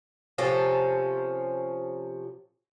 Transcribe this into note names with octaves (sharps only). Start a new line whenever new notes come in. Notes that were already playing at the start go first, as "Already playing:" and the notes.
C3 F3 C#4 A4